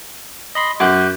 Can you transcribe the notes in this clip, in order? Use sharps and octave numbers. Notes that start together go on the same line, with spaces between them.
D#5 B5 C6
F#2 D6 F#6 G6